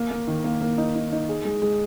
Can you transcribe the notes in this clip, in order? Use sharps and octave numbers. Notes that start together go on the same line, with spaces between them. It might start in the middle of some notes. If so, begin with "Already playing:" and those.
Already playing: A#3
A#3
D#3
A#3
A#3
D#4
D#4
D#4
G#4
G#3
G#3